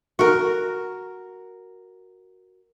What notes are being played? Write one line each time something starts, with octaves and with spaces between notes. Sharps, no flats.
F#4 A#4